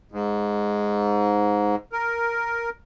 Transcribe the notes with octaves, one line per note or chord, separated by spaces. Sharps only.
G#2
A#4